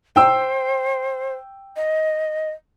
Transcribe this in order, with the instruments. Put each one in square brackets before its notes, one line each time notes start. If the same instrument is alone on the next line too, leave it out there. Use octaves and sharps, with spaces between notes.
[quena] C5 [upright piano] G5 E6
[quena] D#5